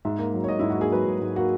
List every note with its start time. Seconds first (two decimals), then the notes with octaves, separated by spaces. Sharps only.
0.05 G#2 E5
0.18 A#3
0.33 F#3
0.44 C#5
0.48 G#2 D#5
0.59 E4
0.62 G#2
0.70 F#4
0.78 A#3 G#4
0.91 F#3 B4
1.06 G#2
1.21 G#2
1.36 A#3 F#4